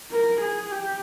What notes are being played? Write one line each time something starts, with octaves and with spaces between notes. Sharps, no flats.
A#4
G#4
G4